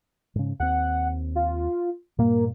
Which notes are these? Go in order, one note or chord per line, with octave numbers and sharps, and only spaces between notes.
G#2 C#3
D#2 C4 F#5
F4
G2 A#2 A#3